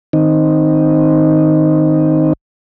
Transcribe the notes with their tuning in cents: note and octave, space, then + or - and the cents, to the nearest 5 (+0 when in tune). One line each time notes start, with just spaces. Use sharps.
D#3 +0 C4 +0 D#4 +0